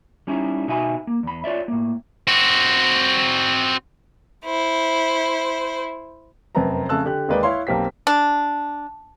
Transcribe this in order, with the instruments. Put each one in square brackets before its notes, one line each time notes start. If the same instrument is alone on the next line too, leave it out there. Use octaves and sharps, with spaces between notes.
[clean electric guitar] G3 C#4 D#4 E4
B2 D#4 F#4 E5 G#5 B5
A#3
E2 B5
F4 C#5 D5 E5
A2 A#3
[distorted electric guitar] C4 F#4
[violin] E4 C5
[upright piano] F1 F#2 C4 B4 A5 A#5
F2 C#3 A3 A5 E6 F#6
D3 G4 F#6
D#2 G#3 A#3 B4 D5 G5
E4 C#5 F5 C6
B1 A#3 C4 G4 B6
[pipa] D4